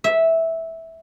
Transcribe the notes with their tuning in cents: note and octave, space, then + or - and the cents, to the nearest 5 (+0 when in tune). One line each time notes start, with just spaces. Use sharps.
E5 -10